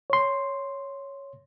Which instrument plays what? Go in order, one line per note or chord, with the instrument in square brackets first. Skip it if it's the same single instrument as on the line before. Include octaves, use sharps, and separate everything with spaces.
[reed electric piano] C#5 C6